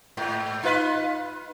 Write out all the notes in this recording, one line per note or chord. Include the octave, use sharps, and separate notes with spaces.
G#2
D#4 F4 B4